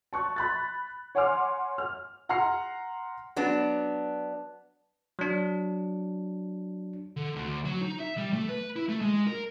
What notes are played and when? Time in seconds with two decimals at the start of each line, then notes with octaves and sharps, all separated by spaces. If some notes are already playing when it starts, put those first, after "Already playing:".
0.13 A5 C#6 F#6
0.36 B5 F#6 A6
1.15 C#5 F#5 G#5 C6 D6 F6
1.78 F6
2.29 F#5 A#5 C6 F6 C7 C#7
3.36 F#3 B3 D4
5.19 F#3 D4
7.17 D3
7.36 D2
7.65 F#3
7.81 D#4
8.00 E5
8.17 G3
8.33 A3
8.49 B4
8.76 E4
8.89 A3
9.01 G#3
9.27 A#4